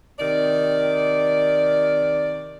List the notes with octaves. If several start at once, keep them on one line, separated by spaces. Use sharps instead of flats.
C3 D#3 D5